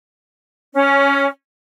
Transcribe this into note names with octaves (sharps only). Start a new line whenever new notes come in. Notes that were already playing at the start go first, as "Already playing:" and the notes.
C#4